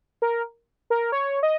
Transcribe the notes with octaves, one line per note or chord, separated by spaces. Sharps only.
A#4
A#4
C#5
D#5